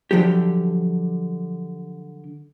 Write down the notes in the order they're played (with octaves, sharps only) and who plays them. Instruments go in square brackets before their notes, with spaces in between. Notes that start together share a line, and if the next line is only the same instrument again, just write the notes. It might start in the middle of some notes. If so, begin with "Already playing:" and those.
[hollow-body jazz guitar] D3 F3 F#3 G4